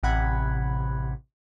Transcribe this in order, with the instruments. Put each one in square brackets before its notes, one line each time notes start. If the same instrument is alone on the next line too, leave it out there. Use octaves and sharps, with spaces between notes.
[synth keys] A1 C3 F#5 B5 G#6